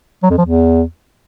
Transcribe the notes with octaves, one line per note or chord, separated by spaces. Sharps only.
F#3
F2
F3
E2